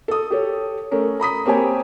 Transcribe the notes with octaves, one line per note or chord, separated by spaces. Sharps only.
A4 D#6
G4 A4 C#5
A3 C#4 A#4
A#5 B5 D#6 B6
A#3 C4 G4 C#5 G#5